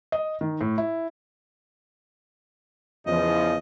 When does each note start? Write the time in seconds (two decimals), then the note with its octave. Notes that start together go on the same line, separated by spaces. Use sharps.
0.12 D#5
0.41 D#3
0.61 A2
0.78 E4
3.07 E2 C#3 F3 D#5